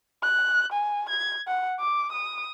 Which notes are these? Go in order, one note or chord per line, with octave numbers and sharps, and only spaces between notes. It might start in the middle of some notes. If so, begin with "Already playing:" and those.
F#6
G#5
G#6
F#5
D6
D#6